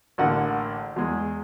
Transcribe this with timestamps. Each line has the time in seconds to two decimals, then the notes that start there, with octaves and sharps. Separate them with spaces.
0.18 A1 D3 A3 A#3 F#5
0.96 E2 G#3